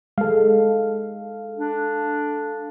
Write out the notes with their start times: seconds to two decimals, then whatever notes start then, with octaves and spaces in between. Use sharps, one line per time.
0.18 G#3 A4 F5
1.57 D4